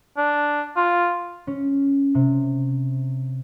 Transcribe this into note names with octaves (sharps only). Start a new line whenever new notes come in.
D4
F4
C#4
C3